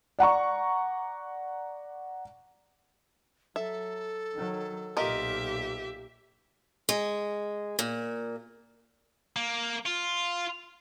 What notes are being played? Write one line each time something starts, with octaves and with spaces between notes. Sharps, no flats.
D5 F#5 A#5 C#6
F#3 A4 E5
D#3 F#3
B1 A#2 F4 G4 A#4 D#5 E5
G#3
A#2
A#3
F4